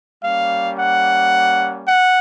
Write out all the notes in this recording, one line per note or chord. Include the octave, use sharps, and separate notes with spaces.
G3 A#3 C#4 F5
F#5
F#5